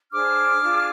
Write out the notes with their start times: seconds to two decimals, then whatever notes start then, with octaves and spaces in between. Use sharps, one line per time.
0.11 D4 G#4 C5 D6 F6
0.61 D4 F4 G#4